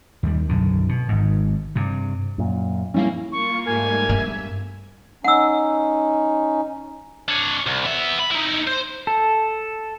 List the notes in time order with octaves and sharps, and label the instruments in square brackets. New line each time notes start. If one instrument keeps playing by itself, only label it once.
[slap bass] D#2 G3
B1 F#2 D3
B2
G#1 G#2
G2 C3
[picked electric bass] F#2 A#2
[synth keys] G2 G3 A#3 [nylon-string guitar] C#4 E4 F5
[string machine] A#3 F4 [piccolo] C#6
[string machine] G#2 G3 A3 [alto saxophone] A#3 [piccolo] G#5
[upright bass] G2 B3 [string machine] E5
[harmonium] C#4 D#4 [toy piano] F#5 E6
[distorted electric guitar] D4 C#5
C2
B3 E5
B5
D#4 E4
C5
[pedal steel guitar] A4